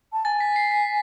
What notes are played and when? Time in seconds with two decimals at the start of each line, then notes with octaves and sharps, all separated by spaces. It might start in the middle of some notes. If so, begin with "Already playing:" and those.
0.13 A5
0.25 G#5 A6
0.40 B6
0.56 C7
0.71 B6